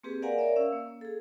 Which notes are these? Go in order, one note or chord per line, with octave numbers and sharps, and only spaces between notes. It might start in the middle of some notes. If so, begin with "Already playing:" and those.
A#3 C4 G4 G#4 B4
A#4 D5 F5 F#5 G#5 A#5
A#4 C#5 D5 E5
C#4 F5 E6
A#3
G#4 A4